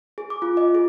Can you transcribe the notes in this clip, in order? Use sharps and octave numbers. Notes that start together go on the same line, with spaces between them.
G#4
D6
F4
D#5
G#4